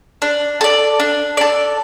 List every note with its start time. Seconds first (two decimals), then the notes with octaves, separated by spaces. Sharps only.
0.22 D4
0.61 A4 D5
1.00 D4
1.37 A4 D5